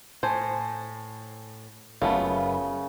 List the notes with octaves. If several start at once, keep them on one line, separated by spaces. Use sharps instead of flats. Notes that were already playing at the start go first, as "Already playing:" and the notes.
A2 C5 G#5 A5 G#6
F#1 C#3 A3 B3 F4 A#4 B5